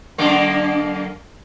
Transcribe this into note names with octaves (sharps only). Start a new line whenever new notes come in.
F#2 D3 A#3